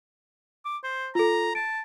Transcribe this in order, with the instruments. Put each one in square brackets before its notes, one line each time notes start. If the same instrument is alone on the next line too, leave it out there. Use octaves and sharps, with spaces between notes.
[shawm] D6
C5
[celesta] F4 A4 [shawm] A#5
[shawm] A5 [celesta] D7